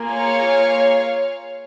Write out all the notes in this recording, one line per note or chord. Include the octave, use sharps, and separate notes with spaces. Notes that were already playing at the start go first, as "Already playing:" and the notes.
Already playing: A#3 F4 G#4
C#5 F5